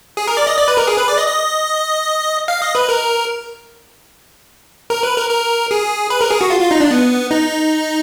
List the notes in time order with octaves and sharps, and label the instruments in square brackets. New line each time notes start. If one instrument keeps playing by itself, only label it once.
[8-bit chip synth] G#4
A#4
D5
D#5
D5
B4
A#4
G#4
B4
D5
D#5
D#5
F5
D#5
B4
A#4
A#4
B4
A#4
A#4
G#4
B4
A#4
G#4
F#4
F4
F4
D#4
D4
B3
D#4